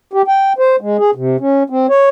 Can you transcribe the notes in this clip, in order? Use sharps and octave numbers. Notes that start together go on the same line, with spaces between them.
G4
G5
C5
G#3
G#4
C3
C#4
C4
C#5